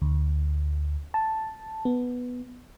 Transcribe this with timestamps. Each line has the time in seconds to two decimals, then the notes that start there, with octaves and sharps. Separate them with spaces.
0.02 D2
1.14 A5
1.85 B3